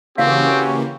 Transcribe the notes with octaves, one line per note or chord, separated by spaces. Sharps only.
C#3 E3 A#3 C4 C#4 F#4 G4 F5